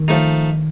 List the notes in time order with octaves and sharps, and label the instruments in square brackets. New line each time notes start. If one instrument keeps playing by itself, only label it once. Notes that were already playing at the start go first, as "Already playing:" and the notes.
Already playing: [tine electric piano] D#3
[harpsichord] F3 A3 D#4